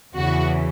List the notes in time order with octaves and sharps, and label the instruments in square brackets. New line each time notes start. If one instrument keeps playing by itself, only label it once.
[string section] E2 C#3 E3 F#4